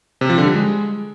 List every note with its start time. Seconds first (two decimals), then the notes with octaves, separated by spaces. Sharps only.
0.21 C3
0.30 F3
0.38 D3
0.46 G3
0.55 G#3